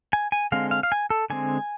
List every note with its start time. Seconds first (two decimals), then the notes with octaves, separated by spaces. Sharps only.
0.13 G#5
0.32 G#5
0.52 D3 G#3 C4 F5
0.71 F5
0.83 F5
0.92 G#5
1.10 A4
1.30 D3 G#3 C4 G#5